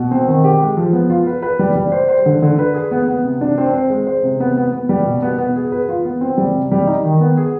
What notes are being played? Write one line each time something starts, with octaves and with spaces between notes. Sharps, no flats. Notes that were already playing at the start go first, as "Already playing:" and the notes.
Already playing: B2
C4
D#3
G4
G#3
F3
B3
F4
B4
B4
G3
G3
C5
C5
D3
D3
B4
G#4
B3
B3
C3
D4
C4
C5
G#3
C5
C3
B3
B3
B3
G3
B2
B3
B3
G#4
B4
F4
B3
C4
G3
C3
G3
D#4
D#3
B3
G#4